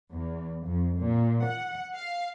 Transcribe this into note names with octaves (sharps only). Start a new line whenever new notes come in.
E2
F2
A#2
F#5
F5